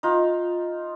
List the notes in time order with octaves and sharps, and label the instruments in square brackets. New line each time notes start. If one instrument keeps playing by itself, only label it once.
[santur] D#4 F4